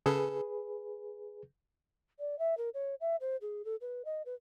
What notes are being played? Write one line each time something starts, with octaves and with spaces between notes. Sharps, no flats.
C#3 G#4 A4 B4
D5
E5
A#4
C#5
E5
C5
G#4
A4
B4
D#5
B4